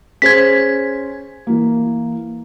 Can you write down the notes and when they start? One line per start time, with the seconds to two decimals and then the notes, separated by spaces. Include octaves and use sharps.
0.22 C#4 G#4 C5 G#6 B6
1.47 E3 A#3